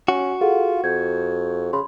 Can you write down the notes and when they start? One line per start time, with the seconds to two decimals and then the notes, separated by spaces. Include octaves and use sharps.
0.08 C#4 F#4
0.41 F4 G#4 A4 F#5
0.84 F2 G6 G#6
1.73 C#3 B5 C6